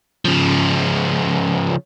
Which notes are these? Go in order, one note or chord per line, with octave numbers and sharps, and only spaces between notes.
C#3 F3